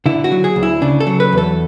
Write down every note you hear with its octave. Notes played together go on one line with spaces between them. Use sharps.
D3 E4
F#4
F#3
G#4
D2
E4
C#3 D4
A4
F#3
B4
E2
A4